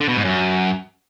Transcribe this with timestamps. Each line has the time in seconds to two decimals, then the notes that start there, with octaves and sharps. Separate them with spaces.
0.01 D3
0.09 B2
0.17 G#2
0.25 F#2